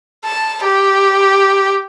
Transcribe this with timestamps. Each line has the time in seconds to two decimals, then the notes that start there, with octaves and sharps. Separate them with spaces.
0.25 A5
0.64 G4